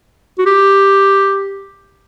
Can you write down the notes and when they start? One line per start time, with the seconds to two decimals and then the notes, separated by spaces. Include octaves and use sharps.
0.38 F#4
0.46 G4